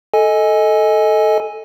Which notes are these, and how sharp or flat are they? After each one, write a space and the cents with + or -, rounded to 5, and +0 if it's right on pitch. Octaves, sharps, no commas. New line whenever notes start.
A4 -5 D#5 +15 G#5 +0